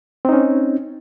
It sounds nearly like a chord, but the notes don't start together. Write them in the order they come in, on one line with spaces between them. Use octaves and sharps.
C4 D#4 C#4